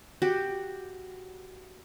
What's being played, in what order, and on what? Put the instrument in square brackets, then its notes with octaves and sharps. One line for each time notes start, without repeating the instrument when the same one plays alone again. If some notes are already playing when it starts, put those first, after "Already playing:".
[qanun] F#4 G4